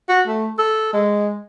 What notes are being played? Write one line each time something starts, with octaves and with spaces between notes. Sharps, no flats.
F#4
A3
A4
G#3